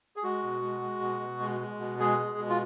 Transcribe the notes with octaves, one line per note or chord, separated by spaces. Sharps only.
G#4
G#3 F#4
B2
G#3
G#3
B2
B2
G#3
G#3
B2
G#3 G#4
G#3
B2
F4